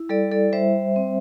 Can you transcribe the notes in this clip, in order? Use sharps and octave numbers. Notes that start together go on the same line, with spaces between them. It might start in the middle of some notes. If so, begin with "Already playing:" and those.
Already playing: E4
G3 A4 D5
A4 D5
G3 C5 E5
C4